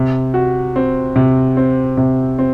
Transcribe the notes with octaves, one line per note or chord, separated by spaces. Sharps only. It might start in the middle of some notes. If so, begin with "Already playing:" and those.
Already playing: C3
F#4
C4
C3
C4
C3
C4